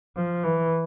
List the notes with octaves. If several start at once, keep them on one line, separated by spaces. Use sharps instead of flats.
F3
E3